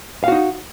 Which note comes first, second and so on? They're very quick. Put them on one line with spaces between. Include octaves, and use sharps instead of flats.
F5 F#4 D#4